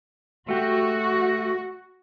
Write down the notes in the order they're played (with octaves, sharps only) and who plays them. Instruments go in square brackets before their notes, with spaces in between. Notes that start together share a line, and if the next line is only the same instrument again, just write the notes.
[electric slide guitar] A3 G4 [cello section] F#4